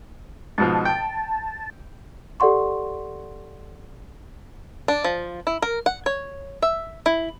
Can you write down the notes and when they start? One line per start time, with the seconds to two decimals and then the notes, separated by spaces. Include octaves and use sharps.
0.58 G#2 B2 F3 A5
0.85 G5
2.40 G4 A4 D5 F#5 C6 C#6
4.88 D4
5.04 F3
5.47 E4
5.62 A#4
5.86 F#5
6.06 C#5
6.62 E5
7.06 E4